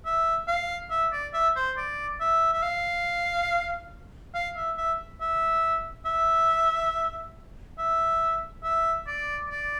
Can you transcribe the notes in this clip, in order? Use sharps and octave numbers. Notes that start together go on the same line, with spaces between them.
E5
F5
E5
D5
E5
C5
D5
E5
E5
F5
F5
E5
E5
E5
E5
E5
E5
D5
D5